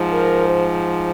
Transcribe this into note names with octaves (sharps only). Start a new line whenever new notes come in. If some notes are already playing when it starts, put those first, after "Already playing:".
Already playing: G#2 F3
A#4
C5